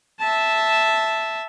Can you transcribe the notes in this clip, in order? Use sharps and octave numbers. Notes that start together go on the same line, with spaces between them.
E5 A5